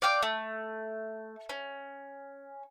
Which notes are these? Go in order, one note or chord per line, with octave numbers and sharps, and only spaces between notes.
D5 F5 G5 D6
A3
C#4